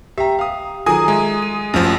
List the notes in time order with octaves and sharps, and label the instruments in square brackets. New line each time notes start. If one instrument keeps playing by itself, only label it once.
[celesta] G4 G5 [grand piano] E5 A#5
[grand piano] F5 D#6
[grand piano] D#3 F#3 G#4 [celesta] F4 A4 A#5 [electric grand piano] G#5 D#6
[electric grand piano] G#3 [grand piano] E5
[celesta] D#7
[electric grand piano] A1 F3 [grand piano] F#2